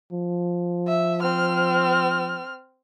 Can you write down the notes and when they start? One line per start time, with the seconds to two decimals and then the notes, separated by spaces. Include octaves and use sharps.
0.12 F3
0.88 E5
1.21 C4 F6